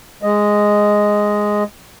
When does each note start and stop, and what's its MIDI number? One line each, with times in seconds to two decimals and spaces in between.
0.23 1.63 56
0.23 1.63 75